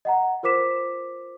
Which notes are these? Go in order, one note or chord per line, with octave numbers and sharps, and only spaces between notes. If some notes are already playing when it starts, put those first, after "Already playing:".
D#5 F#5 A#5
F4 A#4 C5 D6 B6 E7